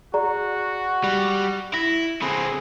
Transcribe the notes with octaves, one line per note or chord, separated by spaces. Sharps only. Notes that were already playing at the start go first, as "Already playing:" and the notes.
F#4 G#4 D5 A#5
G3
E4 A#6
D3 C4 G#4 B5